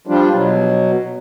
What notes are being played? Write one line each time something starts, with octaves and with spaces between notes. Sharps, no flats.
F3 G3 D4 F4
B2 F#3